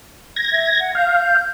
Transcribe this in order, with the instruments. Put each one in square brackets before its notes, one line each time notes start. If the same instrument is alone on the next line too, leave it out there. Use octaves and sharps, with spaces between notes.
[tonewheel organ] G#6 A#6
[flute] E5
F#5
[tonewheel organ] F5 [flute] G6